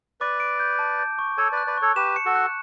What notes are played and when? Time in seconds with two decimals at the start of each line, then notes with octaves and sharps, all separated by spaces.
0.21 B4 D5 D6
0.40 D7
0.60 G6
0.79 A5
0.99 G6
1.19 C#6
1.38 A4 C#5 A5
1.52 B4 D5
1.57 F#6
1.67 B4 D5
1.77 A4 C#5 C#6
1.96 G4 B4 E7
2.16 C#7
2.25 F#4 A4
2.36 F#6